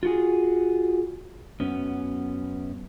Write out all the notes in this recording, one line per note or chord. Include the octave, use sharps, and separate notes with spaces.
F4 F#4 G#4
F#2 B3 C#4